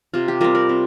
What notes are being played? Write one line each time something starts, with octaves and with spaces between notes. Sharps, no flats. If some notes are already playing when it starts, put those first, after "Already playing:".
C3 F4
G4
G3 C4 F4 A#4
A#4 D5
C3